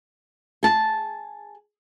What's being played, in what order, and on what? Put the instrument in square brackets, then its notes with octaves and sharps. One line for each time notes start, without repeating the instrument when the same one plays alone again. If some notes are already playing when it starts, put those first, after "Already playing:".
[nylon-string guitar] G#4 A5